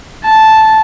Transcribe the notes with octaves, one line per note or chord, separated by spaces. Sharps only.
A5